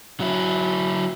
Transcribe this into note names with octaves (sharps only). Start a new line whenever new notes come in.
F#3 E4